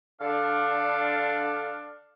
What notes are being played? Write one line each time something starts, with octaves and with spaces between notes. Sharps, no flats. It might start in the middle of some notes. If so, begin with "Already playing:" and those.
D3 D4 A4 F5